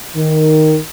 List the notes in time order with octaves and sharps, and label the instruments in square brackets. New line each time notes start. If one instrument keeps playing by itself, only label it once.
[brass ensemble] D#3